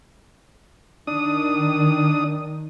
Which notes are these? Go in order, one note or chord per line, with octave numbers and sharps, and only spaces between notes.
D#3 D4 D#6